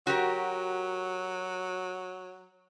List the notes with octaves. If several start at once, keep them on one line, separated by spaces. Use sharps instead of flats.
F#3 F#4 G4 A#4